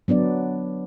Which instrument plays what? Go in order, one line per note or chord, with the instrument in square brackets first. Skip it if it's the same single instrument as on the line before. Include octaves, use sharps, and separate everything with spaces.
[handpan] F#3 B3 D4 D5